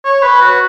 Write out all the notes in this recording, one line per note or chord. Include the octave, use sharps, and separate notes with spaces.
C#5
B4
F#4